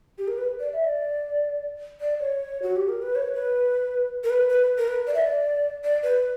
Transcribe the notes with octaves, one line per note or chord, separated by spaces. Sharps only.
G4
A#4
B4
D5
E5
D5
D5
C#5
F#4
G4
A#4
B4
C#5
B4
A#4
B4
B4
A#4
B4
D5
E5
D5
D5
B4